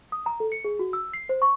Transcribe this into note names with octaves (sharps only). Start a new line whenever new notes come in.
D#6
A#5
A4
C#7
G#4
F#4
E6
C7
C5
C#6